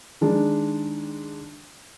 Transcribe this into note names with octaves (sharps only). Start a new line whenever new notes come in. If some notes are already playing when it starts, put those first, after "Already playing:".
D#3 G#3 D4